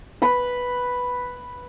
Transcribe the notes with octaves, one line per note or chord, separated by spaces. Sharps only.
B4 B5